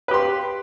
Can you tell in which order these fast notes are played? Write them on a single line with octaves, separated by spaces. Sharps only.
B4 G4 C6